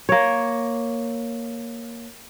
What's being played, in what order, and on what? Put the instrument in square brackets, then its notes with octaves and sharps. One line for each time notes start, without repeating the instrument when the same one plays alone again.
[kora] A#3 C#5